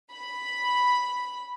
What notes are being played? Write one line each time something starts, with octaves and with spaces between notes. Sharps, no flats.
B5